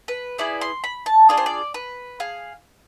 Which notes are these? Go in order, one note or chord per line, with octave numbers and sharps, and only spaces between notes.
B4
B3 E4 G#4 D5
C6
B5
A5
D4 F4 G#4 D5
C5
D5
B4
G#4 F5